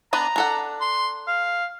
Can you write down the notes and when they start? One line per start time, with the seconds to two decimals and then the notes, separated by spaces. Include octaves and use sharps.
0.13 B3 D4 B4 A#5
0.36 D4 A4 F#5
0.81 C6
1.28 F5